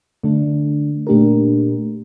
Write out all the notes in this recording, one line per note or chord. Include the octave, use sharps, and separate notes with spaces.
D3 A3 D4
A#2 A3 D4 G4 A#4